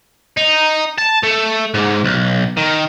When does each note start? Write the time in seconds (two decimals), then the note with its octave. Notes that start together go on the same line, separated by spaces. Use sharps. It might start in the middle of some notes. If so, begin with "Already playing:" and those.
0.37 D#4
0.98 A5
1.23 A3
1.74 G#2
2.04 B1
2.57 D#3